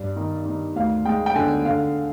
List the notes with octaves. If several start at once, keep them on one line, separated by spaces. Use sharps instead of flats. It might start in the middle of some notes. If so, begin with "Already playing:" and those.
Already playing: G2 D5
D#3
D#3
D2 F5
G#3 G5
G5
D3 G#5
D3 F5